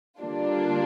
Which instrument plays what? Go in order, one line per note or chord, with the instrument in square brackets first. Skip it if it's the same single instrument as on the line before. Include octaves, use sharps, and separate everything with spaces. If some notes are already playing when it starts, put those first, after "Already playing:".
[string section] D3 G3 A#3 D4 F4